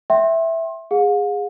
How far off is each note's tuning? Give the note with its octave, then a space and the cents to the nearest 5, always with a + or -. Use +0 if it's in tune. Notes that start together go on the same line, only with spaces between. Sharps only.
E5 +0 G5 -25 C6 +30
G#4 -20 F5 +45